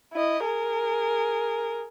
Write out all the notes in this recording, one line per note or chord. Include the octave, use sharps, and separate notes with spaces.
E4 D#5
G#4 A#4